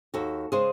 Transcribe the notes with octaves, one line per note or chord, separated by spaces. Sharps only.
D#2 F#4 A4
C#3 G#3 G#4 C5